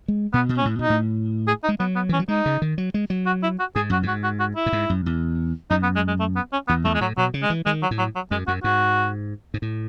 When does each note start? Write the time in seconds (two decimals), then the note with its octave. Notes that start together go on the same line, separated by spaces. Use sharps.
0.08 G#3
0.33 B2 B3
0.49 B2
0.58 C#4
0.65 A2
0.79 B2 D#4
0.90 A2
1.48 G#4
1.64 D#4
1.69 G#3
1.80 F#3 B3
1.96 B3
2.09 E3 C#4
2.19 F#3
2.28 G#3 D#4
2.46 C#3
2.62 D#3
2.78 F#3
2.94 G#3
3.10 F#3
3.27 F#4
3.43 E4
3.60 F#4
3.76 G#2 G#4
3.90 F#2 F#4
4.03 G#2
4.08 F#4
4.24 F#4
4.40 F#4
4.57 E4
4.66 A2
4.73 G#2
4.90 F#2
5.06 E2
5.70 F#2 D#4
5.83 B3
5.96 G#3
6.08 G#3
6.20 A3
6.36 B3
6.53 C#4
6.68 E2 B3
6.85 E2 A3
6.94 G#3
7.01 A2 F#3
7.17 B2 F#3
7.34 C#3
7.43 G#3
7.50 E3
7.66 D#3 G#3
7.82 F#3
7.91 A2
7.98 F#3
8.15 F#3
8.31 F#2 G#3
8.47 F#2 F#4
8.64 G#2 F#4
9.54 G#2
9.62 A2